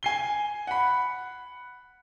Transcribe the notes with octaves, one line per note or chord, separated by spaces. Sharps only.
G#5 C7 G7
F#5 B5